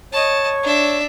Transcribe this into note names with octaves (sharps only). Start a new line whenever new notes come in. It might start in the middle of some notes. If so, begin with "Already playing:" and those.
C#5 D#5 A5
D4 E5